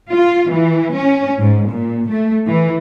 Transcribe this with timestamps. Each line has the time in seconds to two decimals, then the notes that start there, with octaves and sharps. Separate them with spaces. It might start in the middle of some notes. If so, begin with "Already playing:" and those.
0.13 F4
0.52 E3
0.96 C#4
1.39 G#2
1.71 A#2
2.11 A3
2.49 E3